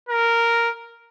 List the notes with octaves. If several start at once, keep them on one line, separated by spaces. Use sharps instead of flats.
A#4